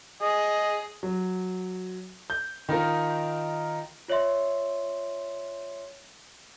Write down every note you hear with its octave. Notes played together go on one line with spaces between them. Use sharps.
G#4 D#5
F#3
G6
D#3 D#4 F4 A#4
F4 C#5 D5 E5 C6